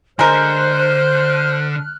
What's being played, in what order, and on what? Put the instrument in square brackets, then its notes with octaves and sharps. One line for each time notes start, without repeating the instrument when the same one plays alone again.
[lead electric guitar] D3 [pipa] G#3 A#4 [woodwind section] C5 [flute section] F6 F#6